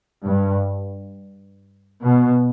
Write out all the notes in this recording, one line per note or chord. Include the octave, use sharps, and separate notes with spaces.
G2
B2